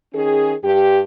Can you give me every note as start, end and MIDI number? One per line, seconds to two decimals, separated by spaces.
0.14 0.53 51
0.14 0.53 61
0.14 0.53 68
0.63 1.00 43
0.63 1.00 67